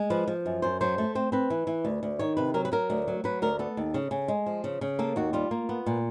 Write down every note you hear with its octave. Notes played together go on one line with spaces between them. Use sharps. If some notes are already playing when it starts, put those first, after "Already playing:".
Already playing: G#3
F3 B4
F3
F#2
F#2 C5
F#3 C5
A3
C4 C5
C4 B4
E3
E3
D2
D2
D#3 C#5
C3 B4
F#3 A#4
B4
F#3 A#4
D2
F#3
F#3 B4
D2 A#4
B3 A4
D#2
C#3
C#3
G#3
F3
C#3
C#3
A#3 A4
D#2 F#4
G3 F4
A#3
B3
A#2